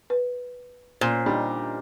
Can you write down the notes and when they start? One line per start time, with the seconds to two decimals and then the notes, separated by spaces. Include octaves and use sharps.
0.10 B4
1.01 A#2 C#4 C5
1.26 G3 D4 D#4 G4